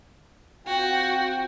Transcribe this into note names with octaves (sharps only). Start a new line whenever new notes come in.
C4 F4 F#4 G5